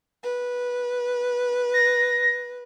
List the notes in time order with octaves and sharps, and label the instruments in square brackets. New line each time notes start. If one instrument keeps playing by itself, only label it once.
[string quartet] B4
[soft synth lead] A#6